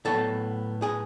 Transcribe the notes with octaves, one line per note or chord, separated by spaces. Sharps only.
A2 F#3 B3 A4 A5
G#4 G#5